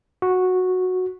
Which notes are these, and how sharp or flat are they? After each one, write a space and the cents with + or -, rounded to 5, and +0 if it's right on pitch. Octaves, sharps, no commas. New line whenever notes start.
F#4 -10